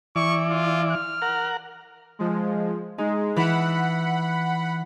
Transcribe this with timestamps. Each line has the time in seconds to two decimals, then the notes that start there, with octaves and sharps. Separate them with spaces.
0.16 E3 D5 C#6
0.50 F4
0.91 F6
1.22 A#4 F#5
2.19 F3 G#3
2.98 G#3 D#4
3.36 E3 E4 F#5 B5